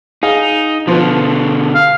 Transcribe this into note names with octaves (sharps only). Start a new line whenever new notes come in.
D#4 G#4 F5
B2 D3 F3 F4 B4
F5